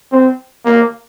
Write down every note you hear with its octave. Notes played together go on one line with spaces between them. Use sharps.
C4
A#3